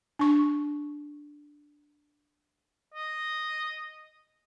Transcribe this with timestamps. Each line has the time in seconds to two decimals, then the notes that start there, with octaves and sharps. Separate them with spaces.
0.19 D4 C#6
2.94 D#5